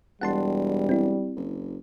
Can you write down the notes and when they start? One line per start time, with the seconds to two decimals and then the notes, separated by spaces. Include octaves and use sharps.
0.21 E1 G3 F#5 A5 C6
0.89 C4 E4
1.36 F#1